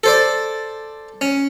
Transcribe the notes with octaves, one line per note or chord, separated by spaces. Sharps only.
A4 C5 D5
C#4